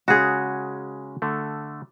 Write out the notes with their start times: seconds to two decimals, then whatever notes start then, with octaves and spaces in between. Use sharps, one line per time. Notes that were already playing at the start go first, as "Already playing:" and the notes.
0.08 C#3 G#3 C#4 F#4 G#4
1.22 D3 A3